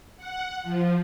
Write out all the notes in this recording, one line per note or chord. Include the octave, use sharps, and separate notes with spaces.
F#5
F3